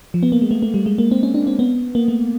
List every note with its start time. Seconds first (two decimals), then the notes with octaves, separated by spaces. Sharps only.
0.14 F3
0.23 B3
0.32 A#3
0.42 G#3
0.51 A3
0.63 A3
0.74 G3
0.86 G#3
0.98 A#3
1.11 C4
1.23 C#4
1.34 D4
1.47 C4
1.59 B3
1.95 A#3
2.08 A3